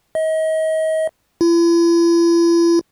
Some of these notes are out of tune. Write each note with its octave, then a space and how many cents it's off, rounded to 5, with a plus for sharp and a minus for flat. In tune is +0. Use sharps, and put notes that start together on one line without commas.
D#5 +35
E4 +45